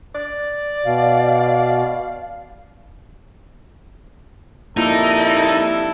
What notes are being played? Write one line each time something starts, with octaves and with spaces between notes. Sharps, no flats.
D5
B2 F5
F2 A#2 G3 D#4 E4 A4